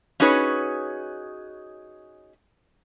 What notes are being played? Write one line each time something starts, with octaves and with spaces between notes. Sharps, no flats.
C#4 D#4 F#4 G#4 B4 C#5